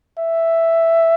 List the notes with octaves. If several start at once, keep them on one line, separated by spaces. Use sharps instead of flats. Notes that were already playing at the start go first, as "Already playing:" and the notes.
E5